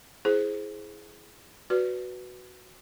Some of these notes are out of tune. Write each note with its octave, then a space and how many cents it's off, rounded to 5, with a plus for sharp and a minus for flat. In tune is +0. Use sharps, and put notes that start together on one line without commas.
E4 +0 G#4 +10 C5 +0
F#4 +0 B4 +0 D5 -15